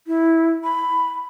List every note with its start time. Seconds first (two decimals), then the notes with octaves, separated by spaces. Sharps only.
0.07 E4
0.64 B5